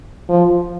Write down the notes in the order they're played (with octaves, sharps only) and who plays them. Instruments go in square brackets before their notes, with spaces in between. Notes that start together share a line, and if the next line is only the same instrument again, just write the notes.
[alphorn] F3